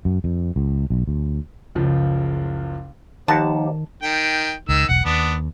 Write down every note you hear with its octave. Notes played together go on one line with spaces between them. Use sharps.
F#2
F2
C#2
B1
D2
F#1 C#2 F3
D#2 D#3 F3 D#4 G4 F#5 A5 A#5
D#3 G5
C#2 D#3 E6
E1 B1 F#5
D#2 B3 D4